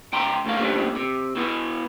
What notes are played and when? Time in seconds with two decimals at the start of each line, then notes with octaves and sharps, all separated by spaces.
0.13 C#2 G5 A#5 C6
0.45 D2 A3 A#3 F5
0.60 F#2 A#2 D3 G3 A3 C4
0.96 C3
1.35 B2 E3 B3